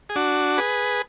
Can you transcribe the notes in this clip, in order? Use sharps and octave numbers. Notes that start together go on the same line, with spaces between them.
G#4
D4 F#4
G#4 B4